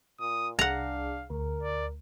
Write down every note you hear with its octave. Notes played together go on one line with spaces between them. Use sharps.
A#2 D#6
C2 D4 G#4 F5 F#5 A#5
D2 A#4
D5